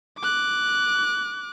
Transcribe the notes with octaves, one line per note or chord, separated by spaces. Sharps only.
D6 F#6